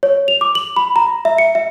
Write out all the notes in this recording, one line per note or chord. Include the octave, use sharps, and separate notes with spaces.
C#5
F7
D6
F#7
B5
A#5
E5
C#7
E5